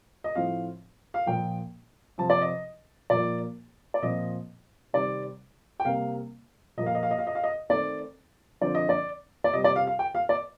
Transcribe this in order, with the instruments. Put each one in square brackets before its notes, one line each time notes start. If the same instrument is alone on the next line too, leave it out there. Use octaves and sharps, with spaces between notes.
[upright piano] D#5
A2 F3 C4 F5
F5
A#2 F3 A#3 G5
C3 F3 C4 A5
D5
D#5
A#2 F3 A#3 D5
D5
A#2 F3 C4 D#5
C3 D#3 G3 C4 D5
G5
C3 G3 A#3 F5
A#2 F3 A#3 D#5
F5
D#5
F5
D#5
F5
D#5
F5
D#5
D#3 A3 C4 D5
D3 F3 C4 D5
D#5
D5
D5
C3 G3 C4 D#5
D5
F5
F5
G5
F5
D5